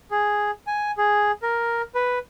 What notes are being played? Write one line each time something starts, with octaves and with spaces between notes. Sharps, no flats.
G#4
G#5
G#4
A#4
B4